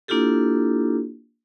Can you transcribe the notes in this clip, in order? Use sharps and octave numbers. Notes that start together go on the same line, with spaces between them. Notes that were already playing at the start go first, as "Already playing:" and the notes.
A#3 D4 E4 F4 G4 A4